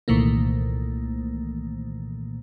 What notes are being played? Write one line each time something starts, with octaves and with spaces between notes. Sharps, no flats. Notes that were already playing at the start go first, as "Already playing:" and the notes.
C2 A#2 D#3 E3 A3 A#3